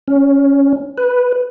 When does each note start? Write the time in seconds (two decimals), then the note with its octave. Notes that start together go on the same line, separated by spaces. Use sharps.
0.08 C#4
0.98 B4